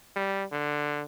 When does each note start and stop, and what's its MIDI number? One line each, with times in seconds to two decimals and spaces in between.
0.16 0.43 55
0.52 1.03 50